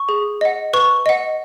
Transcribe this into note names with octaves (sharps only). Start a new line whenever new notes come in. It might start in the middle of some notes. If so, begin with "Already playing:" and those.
Already playing: C#6
G#4
D#5 F#5
B4 C#6
D#5 F#5